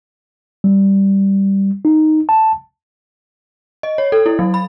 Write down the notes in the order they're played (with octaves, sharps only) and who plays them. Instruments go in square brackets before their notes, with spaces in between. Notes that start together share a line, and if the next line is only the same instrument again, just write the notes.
[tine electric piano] G3
D#4
A5
[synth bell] D#5
C#5
A4
E4
F#3
B5